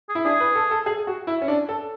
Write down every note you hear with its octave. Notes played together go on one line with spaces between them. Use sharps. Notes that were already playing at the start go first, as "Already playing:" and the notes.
G#4
E4
D4 G#4
B4
A4
A4
G#4
F#4
E4
C#4
D4
A4